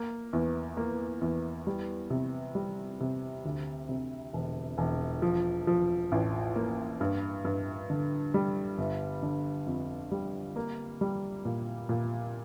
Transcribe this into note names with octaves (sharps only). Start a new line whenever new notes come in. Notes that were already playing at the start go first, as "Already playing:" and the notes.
Already playing: A#3
E2
A#3
E2
G3
C3
G3
C3
D2
C3
E1
E1
F3
F3
A1
A#3
G2
G2
D3
G3
G1
D3
F2
G3
A#3
G3
A#2
A#2